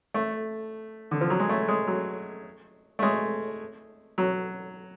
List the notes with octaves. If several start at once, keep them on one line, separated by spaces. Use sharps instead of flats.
A3
D3
F3
F#3
G#3
A3
G#3
F#3
A3
G#3
F#3